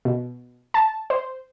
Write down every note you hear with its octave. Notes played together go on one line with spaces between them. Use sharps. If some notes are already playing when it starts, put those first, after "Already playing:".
B2
A5
C5